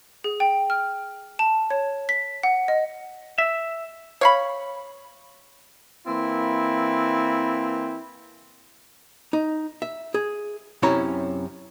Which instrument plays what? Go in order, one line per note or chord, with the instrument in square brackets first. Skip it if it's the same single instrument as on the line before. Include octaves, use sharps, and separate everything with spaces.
[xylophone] G#4
G5
F6
A5
C#5
B6
F#5
D#5
[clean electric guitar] E5
[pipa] C#5 F5 B5
[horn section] E3 A#3 C4 E4
[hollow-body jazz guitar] D#4
E5
G#4
F#2 C3 C#4 E4 C#5 A#5